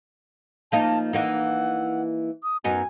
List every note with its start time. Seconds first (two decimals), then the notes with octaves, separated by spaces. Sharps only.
0.72 F3 A#3 D#4 A5
1.13 E3 A#3 D#4 F#5
2.43 D#6
2.64 F#2 B3 D#4 G#5